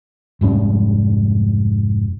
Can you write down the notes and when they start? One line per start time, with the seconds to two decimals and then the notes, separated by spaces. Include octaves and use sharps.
0.41 F1 G#2 G3 C#4